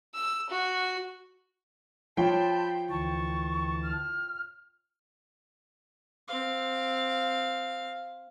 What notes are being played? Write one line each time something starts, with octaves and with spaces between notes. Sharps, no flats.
E6
F#4
F3 C#5 G5 A5 B5 C6 G6
D2 E3 A5 C#6
F6
C4 F5